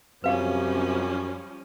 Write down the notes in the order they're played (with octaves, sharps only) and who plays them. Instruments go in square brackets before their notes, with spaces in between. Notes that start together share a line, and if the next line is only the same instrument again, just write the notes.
[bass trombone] F#2 [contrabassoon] C3 [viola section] F3 G3 C#4 [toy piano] B4 F5